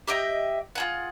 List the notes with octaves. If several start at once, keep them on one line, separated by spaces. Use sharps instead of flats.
G4 D#5 E5 G5
F4 G#4 F#5